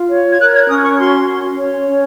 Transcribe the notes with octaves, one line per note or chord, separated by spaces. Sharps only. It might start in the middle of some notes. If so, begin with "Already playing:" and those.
Already playing: F4
C#5
G#6
A#4 F#6
G#6
C#4 D#6
C#6
F#4 C6
C#4
C#5
C#4